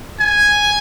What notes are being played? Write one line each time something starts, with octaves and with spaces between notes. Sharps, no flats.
G#5